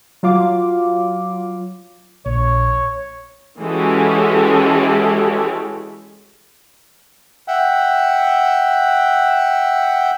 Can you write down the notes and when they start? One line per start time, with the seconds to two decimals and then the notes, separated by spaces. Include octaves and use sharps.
0.23 F#3 F4 F5 D6
2.26 A#1 C#5
3.59 E3 G#3 C#4 F#4 G4 A4
7.48 E5 F#5 G5